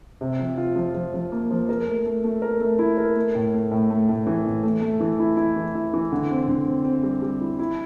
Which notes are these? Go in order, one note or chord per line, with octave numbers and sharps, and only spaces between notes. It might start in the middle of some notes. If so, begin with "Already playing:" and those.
C3
F3
F4
F3
F3
F3
A#3
F3
A#4
A3
A3
A3
A#4
A3
E4
A#4
A3
A2
A3
A2
A3
A2
E3
A2
A3
A3
E3
E4
E4
E3
E4
E3
D3
C4
D3
C4
C4
G3
G3
E4
E4